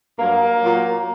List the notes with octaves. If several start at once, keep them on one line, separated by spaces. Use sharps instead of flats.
G2 F#3 A#3
A#2 F#3